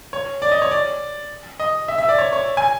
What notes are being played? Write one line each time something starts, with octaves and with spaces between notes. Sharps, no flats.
C#5
D5
D#5
C#5
D5
D#5
E5
E5
D5
C#5
C#5
G#5